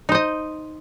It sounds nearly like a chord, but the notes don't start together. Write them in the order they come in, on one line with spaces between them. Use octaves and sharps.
D#4 C5 D#5